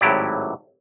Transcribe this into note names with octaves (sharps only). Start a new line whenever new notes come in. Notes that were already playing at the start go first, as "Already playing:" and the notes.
G#1 A2 F#3 E4 G4 D5